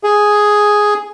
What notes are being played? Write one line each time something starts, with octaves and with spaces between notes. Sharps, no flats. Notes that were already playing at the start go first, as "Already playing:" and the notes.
G#4